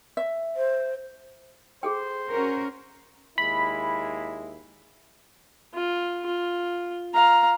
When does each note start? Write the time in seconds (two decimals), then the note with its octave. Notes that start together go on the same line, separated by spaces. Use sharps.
0.17 E5
0.56 C5
1.83 G#4 A4 C5 G5
2.30 C#4 F#4 A#4
3.38 D#2 G#3 E4 B5
5.75 F4
6.26 F4
7.14 F5 A#5